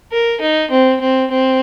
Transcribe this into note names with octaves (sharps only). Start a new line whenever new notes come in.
A#4
D#4
C4
C4
C4